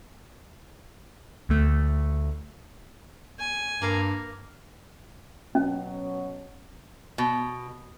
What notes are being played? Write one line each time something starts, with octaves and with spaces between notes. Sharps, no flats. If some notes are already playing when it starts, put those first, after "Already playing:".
D2 A3
G#5
G2 A#3 A#4 F5
B2 F#3 C#4
B2